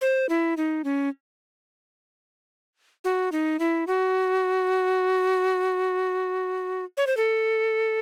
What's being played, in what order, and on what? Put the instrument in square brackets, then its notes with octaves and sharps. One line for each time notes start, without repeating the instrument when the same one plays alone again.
[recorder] C5
E4
D#4
C#4
F#4
D#4
E4
F#4
C#5
C5
A4